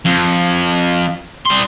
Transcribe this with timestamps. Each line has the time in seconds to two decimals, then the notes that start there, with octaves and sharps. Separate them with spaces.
0.06 F2
1.46 G3 C6